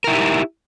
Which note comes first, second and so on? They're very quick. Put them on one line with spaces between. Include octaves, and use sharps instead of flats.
A#4 E4 D#4 G4